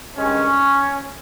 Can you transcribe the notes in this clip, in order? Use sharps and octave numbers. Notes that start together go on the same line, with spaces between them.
G2 D#3 G#3 C#4